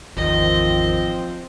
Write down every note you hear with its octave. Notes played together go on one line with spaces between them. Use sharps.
G#1 E2 D#3 F3 C4 D#5